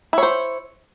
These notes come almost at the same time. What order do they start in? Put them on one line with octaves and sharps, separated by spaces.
E4 C#5 C5